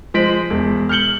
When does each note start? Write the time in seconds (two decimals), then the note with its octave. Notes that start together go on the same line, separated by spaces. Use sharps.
0.14 F3 G#3 C5 B6 D7 F#7
0.50 E1
0.89 F6 G6 C#7 F#7 G7